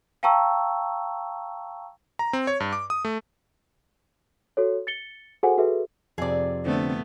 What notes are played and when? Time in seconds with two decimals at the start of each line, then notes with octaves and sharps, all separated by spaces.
0.23 F5 G5 A5 A#5 C#6 E6
2.19 A#5
2.33 C4
2.47 C#5
2.60 G2
2.73 D6
2.90 D#6
3.05 A3
4.57 F#4 A4 C#5
4.87 A6 C#7 G7
5.43 F#4 G#4 A4 C5 F#5 G#5
5.58 F#4 G#4 A4 B4 E5
6.18 F2 C3 G#4 D5
6.65 D3 A3 B3 C4